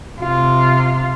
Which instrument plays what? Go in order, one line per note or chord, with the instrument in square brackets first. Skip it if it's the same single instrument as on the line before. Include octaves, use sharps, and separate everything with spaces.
[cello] C3 F4